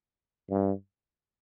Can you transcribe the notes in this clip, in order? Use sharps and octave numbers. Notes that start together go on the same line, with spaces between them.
G2